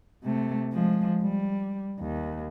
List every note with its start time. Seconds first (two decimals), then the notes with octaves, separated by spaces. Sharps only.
0.24 C3 A3
0.73 F3 G#3
1.23 G3
2.00 D#2